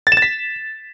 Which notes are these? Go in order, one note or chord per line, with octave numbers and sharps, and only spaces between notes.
A6
E7
A6
B6